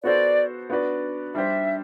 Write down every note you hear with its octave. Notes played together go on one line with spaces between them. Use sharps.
B3 F#4 A4 C5 D5
B3 D4 F#4 B4 D5
G3 D4 G4 C5 E5